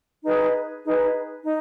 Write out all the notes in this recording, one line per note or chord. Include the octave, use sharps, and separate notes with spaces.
D#4 G#4 B4
D#4 G#4 B4
D#4